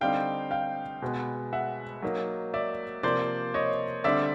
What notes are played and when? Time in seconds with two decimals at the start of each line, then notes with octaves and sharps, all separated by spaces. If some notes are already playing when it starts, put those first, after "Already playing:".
0.01 D3 G3 C4 D#4 F5 G5
0.51 F5 G5
1.02 B2 G#3 B3
1.53 E5 F#5
2.02 F#3 A#3 D#4
2.54 D5 E5
3.03 C3 F3 A#3 C5 D5
3.54 C#5 D#5
4.04 D3 G3 C4 D5 E5